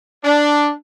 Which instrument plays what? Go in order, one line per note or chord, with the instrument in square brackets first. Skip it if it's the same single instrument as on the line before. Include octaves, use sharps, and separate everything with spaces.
[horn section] D4